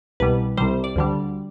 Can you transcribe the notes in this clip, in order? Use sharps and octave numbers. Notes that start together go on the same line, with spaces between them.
C2 B2 G3 B4
C2 C3 G3 C5
D5
D2 D3 G3